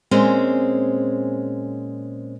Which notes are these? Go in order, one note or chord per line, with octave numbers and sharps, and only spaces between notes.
A#2 G#3 C4 C#4